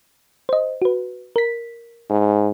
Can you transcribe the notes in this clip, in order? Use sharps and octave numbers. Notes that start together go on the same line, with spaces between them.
C5 D#5
F#4 B4
A#4 B6
G#2